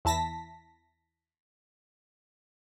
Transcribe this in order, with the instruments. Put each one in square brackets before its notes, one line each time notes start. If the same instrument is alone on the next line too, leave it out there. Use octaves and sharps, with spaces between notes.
[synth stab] E2 E4 A5 A#6 B6